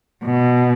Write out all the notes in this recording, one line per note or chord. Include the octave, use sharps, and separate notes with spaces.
B2